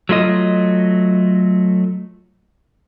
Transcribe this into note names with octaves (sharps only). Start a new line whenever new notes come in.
F#3 A3 F4 D#5